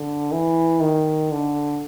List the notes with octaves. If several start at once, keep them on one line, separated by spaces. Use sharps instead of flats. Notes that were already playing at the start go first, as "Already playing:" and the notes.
Already playing: D3
E3
D#3
D3